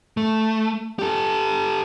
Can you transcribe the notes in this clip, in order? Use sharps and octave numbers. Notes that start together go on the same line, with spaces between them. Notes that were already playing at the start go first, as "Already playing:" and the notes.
A3
G4 A4